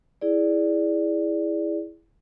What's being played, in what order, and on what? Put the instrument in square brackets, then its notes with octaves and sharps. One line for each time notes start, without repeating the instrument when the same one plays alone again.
[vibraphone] E4 G#4 D5